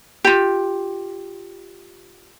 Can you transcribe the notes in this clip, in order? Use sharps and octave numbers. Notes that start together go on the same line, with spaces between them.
F4 G4